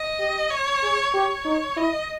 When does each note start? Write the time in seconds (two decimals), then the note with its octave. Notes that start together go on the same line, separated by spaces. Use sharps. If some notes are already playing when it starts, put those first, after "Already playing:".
Already playing: D#5
0.19 G4
0.51 C#5
0.83 G#4
1.14 G4 C#5
1.45 D#4
1.77 E4 D#5